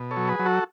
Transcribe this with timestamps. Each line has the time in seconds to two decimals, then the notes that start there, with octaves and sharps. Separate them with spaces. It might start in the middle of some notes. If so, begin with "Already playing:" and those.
Already playing: B2
0.11 A4 C#5
0.17 F#3
0.28 G#4 B4
0.39 F#3
0.46 F#4 A4